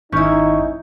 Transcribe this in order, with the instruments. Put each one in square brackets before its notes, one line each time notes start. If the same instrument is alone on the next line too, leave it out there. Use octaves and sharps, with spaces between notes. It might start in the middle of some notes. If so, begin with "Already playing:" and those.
[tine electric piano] G#1 C#6 G6 [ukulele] C#4 E4 [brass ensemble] D#4